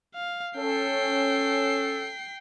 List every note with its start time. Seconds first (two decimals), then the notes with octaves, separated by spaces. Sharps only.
0.15 F5
0.57 C#4 A4 G5 C7